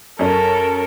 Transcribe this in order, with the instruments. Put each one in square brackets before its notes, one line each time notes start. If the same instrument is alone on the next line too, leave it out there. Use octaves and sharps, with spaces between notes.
[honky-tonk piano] F#2 C#4 [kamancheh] A4 A#4